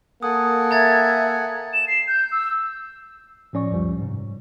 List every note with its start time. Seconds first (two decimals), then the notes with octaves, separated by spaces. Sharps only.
0.23 A#3 A4 F#5 G#5 D#6
0.71 E5 A#5 G#6 A6
1.73 E7
1.88 C7
2.08 G6
2.32 E6
3.53 A2 F3 C#4 D5 C#6
3.71 C#2 F#2 F3 G3
3.98 G#2 C3